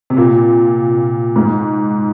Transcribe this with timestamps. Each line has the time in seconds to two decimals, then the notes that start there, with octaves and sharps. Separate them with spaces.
0.10 C3
0.17 A#2
1.36 G#2